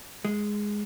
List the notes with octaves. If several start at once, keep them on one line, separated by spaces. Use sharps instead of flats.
G#3